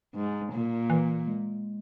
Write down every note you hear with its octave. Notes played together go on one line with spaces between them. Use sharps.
G#2
A#2
E3
G#3